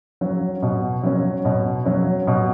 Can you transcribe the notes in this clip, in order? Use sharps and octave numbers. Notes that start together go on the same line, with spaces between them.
F#3 C#4
B2
F#3 C#4
B2
F#3 C#4
B2